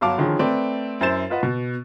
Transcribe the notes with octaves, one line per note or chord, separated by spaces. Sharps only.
G1 F#3 F#4 F5 A5 D6
D3 D#3 F3 C#4 G#4
A3 C4 B4 D5
F#2 E4 C5 A6 E7
F4 B4 D#5 F#5
B2